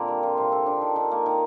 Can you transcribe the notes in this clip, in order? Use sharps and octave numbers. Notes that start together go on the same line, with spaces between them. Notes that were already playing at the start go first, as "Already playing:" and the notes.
Already playing: A#2 D3 A#3 C4
G3
F4
C3
A4
D4
D#3
D#3
A#3
D#3